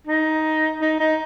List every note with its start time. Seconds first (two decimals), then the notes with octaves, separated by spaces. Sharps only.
0.07 D#4
0.81 D#4
1.00 D#4